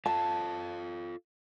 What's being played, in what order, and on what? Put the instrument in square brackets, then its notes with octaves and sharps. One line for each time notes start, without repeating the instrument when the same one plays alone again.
[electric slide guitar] F4 A4 F5 [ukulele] A5